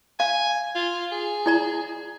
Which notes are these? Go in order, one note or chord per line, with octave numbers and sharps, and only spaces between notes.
F5 G#5
F4
G#4
E4 D5 A#5